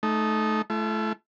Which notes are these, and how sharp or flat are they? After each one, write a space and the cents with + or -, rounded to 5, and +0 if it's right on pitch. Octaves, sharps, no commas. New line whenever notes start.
A3 -20 D#4 +0
A3 -25 E4 +40